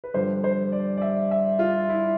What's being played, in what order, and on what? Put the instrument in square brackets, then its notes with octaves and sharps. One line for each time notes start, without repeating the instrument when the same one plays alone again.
[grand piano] B4
G2 D3 F3 C5
C5
D5
D5
E5
E5
F4
E4